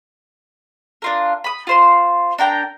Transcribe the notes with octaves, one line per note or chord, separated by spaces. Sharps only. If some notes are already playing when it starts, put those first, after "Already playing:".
D4 F4 A#4
B5 D#6
F4 C5 C6
D4 A#4 G5 A#5